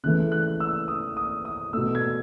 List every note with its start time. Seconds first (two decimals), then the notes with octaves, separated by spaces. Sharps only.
0.04 C#3 E3 A3 F#6
0.32 F#6
0.60 E6
0.88 D#6
1.17 D#6
1.45 D#6
1.73 B2 A3 E6
1.95 G#6